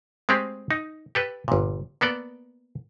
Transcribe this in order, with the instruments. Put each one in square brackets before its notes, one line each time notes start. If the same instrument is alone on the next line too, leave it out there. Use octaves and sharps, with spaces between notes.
[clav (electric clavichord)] G#3 A3 C4 G4 G#4
D#4
G4 A4 B4
G1 A#2
A#3 B3 A4 D5